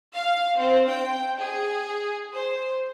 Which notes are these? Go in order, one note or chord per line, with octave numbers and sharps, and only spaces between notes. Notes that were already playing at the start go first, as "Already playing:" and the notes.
F5
C4
G5
G#4
C5